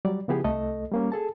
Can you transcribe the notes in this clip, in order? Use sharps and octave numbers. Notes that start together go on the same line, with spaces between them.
F#3 G3 D5
C#3 F3 B3 E4 G4 G#4
C2 A3 A4 D#5
G3 A#3 C#4
G#4 A4 A5